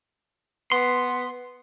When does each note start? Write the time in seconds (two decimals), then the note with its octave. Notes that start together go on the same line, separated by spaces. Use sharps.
0.72 B3 C6